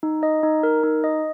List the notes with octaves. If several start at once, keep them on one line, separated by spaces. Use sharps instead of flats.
D#4
D#5
D#4
A#4
D#4
D#5